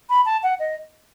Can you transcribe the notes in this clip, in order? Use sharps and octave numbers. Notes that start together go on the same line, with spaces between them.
B5
A5
F#5
D#5